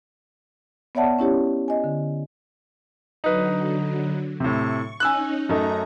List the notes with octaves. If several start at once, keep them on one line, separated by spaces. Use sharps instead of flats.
B3 C#5 D5 E5 F#5 A5
C#4 E4 G4 C#5
D#5 G#5
D3
D3 F#3 D#4 B4
A2 C3 C#6
C#4 D#4 G#5 E6 F#6
F#2 A3 D#4 A#5